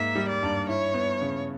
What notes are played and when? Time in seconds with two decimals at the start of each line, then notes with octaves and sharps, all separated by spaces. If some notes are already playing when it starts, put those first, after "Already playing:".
Already playing: G#2 A#3 E5
0.15 G3
0.28 D5
0.43 G2
0.69 E4 C#5
0.94 B3
1.21 C#3